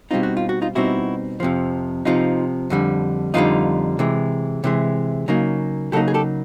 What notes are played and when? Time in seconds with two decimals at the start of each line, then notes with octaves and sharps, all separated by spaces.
0.11 B2 G3 C4 D#4 F4
0.23 F#4
0.37 F4
0.49 F#4
0.62 D#4 F4
0.75 B2 G3 C4 D#4 E4 F#4
1.40 F2 C3 F3
2.05 F2 C3 F3 D#4 F4
2.70 F2 D3 G3
3.34 F2 D3 G3 D#4 F4
3.99 C3 E3 G#3
4.64 C3 E3 G#3
5.28 C#3 F#3 A#3 D#4
5.92 C#3 F#3 A#3 D#4 G4 A4
6.08 G#4
6.14 G4 A4